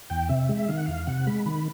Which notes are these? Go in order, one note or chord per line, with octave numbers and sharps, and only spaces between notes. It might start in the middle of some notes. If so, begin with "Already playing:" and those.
E2 G5
C3 E5
G#3
D#3 F5
F#5
E2 F5
C3 F#5
G#3 B5
D#3 B5